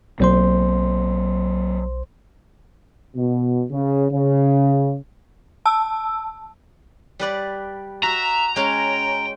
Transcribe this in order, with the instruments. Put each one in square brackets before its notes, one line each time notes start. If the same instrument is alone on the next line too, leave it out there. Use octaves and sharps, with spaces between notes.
[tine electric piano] B1 C5 C6 [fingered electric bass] F#3 A#3 C4
[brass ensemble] B2
C#3
C#3
[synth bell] A5 E6
[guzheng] G3 B4 D5
[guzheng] F#4 [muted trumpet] E5 [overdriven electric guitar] A#5
[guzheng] G#3 C#4 [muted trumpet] G5